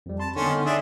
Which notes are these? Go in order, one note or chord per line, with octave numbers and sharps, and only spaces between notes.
F2 G3
A5 B5 C6
D3 D#3 B3 C#4 C6
D4 G#4 E5